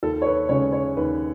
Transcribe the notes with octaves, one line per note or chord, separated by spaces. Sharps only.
D#2 A4
C#5
B4
C#3 G#3 C#4 C#5
C#5
D#2 B4